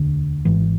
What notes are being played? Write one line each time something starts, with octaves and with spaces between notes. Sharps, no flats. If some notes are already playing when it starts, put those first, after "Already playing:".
Already playing: E1 D2 D3
G#1 G#2 E3